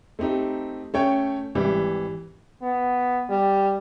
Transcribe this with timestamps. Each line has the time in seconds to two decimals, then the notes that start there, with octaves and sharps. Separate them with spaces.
0.19 A3 C4 D#4 G4
0.94 A3 C#4 C#5 G5
1.55 G#1 E3 G3
2.62 B3
3.29 G3